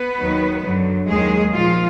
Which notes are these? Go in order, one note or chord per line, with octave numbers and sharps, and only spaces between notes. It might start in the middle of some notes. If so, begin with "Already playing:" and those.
Already playing: B3 B4
D#2 D#3 F#3
F#2 D3 F#3
D#2 D#3 F#3 G#3 G#4
A#2 F3 G#3 F4